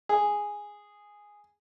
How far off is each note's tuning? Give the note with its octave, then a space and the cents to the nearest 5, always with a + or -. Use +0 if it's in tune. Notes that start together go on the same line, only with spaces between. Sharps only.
G#4 -5